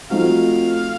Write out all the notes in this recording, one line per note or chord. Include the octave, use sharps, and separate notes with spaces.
F3 A3 C4 D#4 F#4 F5